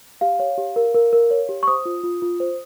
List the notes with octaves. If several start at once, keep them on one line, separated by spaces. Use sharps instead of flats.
G4 F5
C#5
G4
A#4
A#4
A#4
C#5
G4
C#6
C5 D#6
F4
F4
F4
C5